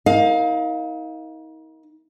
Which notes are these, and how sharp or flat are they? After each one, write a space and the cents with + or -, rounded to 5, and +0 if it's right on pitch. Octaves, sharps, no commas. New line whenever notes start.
D#4 +40 A#4 +0 F5 +20